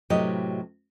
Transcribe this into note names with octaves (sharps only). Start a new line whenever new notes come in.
A2 C3 F#3 G4 B4 D#5